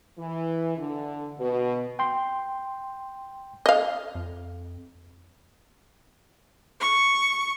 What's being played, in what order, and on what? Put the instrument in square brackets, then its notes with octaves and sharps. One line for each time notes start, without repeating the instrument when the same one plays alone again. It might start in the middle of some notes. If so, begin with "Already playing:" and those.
[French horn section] E3
D3
B2
[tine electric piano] G5 C6
[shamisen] D#5 F5
[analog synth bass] F2
[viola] C#6